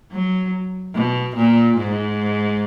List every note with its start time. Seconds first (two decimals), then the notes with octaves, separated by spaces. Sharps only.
0.12 F#3
0.94 B2
1.36 A#2
1.77 G#2